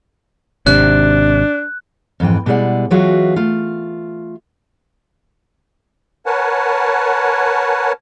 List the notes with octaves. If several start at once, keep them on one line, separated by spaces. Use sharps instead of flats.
G#1 C3 D4 F#6
F2 G#2 E3 G5
B2 G3 G#3 E4 D5 F#5
E3 F#3 G#3 F4 F#4 E5
A3 F4
A#4 B4 C#5 F#5 G#5 A5